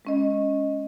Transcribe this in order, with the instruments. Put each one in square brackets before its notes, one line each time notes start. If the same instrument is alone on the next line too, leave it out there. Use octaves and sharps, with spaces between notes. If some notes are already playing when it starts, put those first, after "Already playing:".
[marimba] G#3 C#4 D#5